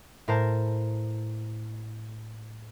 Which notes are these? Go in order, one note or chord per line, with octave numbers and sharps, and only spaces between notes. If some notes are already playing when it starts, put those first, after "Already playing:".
A2 A#4 C5 A5